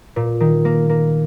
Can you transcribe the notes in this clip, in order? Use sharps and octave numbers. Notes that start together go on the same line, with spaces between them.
A#2
D#3
A#3
A#3